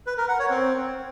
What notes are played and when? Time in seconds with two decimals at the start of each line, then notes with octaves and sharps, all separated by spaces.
0.07 B4
0.18 A#4
0.28 F#5
0.39 C#5
0.50 C4